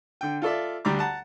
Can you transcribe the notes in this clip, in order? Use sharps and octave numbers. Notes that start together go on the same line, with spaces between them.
D3 G5
F4 A4 D5 E5
D2 G3 D4 A#5 D6
F#5 A5 A#5